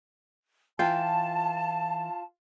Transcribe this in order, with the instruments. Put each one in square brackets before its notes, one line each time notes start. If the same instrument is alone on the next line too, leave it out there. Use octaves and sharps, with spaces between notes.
[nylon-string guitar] E3 G5 [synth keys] F4 [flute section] A5